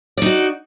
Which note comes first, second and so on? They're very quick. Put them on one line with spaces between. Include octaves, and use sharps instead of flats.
D5 D#4 F#4